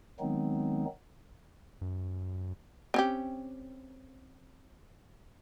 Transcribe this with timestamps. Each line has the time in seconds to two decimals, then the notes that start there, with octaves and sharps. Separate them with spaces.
0.20 D#3 F#3 G#3 B3 C4 D#4
1.81 F#2
2.94 C4 C#4 G4